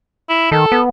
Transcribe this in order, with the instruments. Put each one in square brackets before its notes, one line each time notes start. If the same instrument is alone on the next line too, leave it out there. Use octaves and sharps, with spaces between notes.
[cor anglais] E4
[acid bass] D#3 [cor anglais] A4
[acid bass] B3